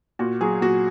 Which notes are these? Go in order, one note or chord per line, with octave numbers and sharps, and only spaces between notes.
A#2 F#4
F#3 G#4
A#2 F#4